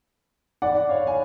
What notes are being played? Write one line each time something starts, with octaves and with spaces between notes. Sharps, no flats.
D5 F#5
C#5 F5
G#5